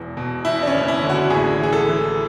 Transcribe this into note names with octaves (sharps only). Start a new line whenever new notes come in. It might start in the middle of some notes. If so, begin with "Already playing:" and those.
Already playing: E1 E2
B2
E2 E4
D4
C#4
F#1
E4
D3
F#4
A1 G#4
E3
G#4
A4
E3